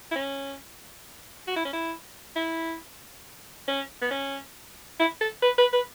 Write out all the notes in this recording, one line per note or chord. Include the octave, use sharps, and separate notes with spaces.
E4
C#4
F#4
E4
C#4
E4
E4
C#4
B3
C#4
E4
A4
B4
B4
B4